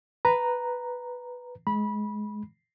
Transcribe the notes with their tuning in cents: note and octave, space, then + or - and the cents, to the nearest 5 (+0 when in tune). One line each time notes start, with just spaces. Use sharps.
B4 +0 A#5 +0
G#3 +20 B5 -20